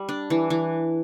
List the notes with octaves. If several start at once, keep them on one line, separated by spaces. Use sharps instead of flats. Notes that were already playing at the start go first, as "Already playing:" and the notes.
Already playing: G3
D4
E3
E3